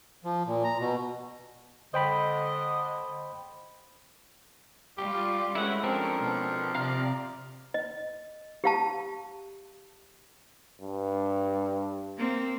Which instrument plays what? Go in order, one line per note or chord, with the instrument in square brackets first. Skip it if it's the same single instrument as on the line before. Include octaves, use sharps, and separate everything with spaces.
[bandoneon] F3
A#2
A#5
B2
[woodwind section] D3 [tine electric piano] C5 G5 B5 [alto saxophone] D#5
[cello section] G3 F4 [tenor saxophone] G4
[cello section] G#3 C#4 [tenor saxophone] A3 [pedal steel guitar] E4 B4 F#5
[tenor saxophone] F3 [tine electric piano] C4 [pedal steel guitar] D4 A4 A#4
[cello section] B2
[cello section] C3 D5 [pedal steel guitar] F5 A#5 F6
[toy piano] D#5
G4 F5 A5
[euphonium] G2
[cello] A#3 C4